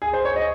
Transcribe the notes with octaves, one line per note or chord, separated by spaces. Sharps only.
G#4
C5
C#5
D#5